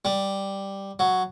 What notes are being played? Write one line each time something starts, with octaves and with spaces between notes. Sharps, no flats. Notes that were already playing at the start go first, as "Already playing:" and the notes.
G3
F#3